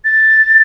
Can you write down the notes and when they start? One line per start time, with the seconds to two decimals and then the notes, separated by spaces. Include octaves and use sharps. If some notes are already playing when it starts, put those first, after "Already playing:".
0.05 A6